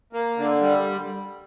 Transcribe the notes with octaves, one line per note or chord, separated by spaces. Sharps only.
A#3
D3
G3